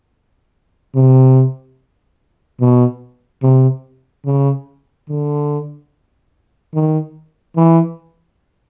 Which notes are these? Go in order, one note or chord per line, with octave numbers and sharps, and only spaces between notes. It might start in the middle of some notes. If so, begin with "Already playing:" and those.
C3
B2
C3
C#3
D3
D#3
E3